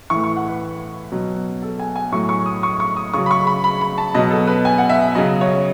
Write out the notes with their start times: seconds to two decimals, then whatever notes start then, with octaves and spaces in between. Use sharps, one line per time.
0.10 A2 E3 C#6
0.24 C#6
0.36 F#5
0.48 B4
1.12 B2 F#3
1.62 A4
1.79 G#5
1.96 G#5
2.12 A2 F#3 C#6
2.29 C#6
2.46 D#6
2.63 C#6
2.80 C#6
2.97 D#6
3.14 C#3 F#3 C#6
3.26 B5
3.31 C#6
3.47 B5
3.64 B5
3.81 B5
3.98 A5
4.15 B2 F#3 D#5
4.31 A4
4.47 B4
4.65 G#5
4.78 F#5
4.89 E5
5.15 C#3 F#3 D#5
5.41 C#5